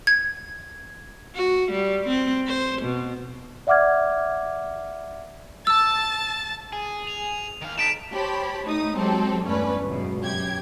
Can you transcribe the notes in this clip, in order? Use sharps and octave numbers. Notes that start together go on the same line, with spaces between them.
G#6
F#4
G3
C4
C5
B2
D5 E5 F#5 D6 F6 G#6
A5 E6 A6
G#4
F7
D#3 F5
D#4 A4 B6 D7 E7
G4 C5 C#5 A5 B5
A3 D#4 D#6
F#3 G#3 C4 G4 A4
E2 G2 A3 C#4 B4 D5
G1 C#2 F#2 B2
F#2 G4 G#6